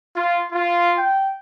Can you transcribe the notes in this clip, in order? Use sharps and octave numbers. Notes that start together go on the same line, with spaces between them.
F4
F4
G5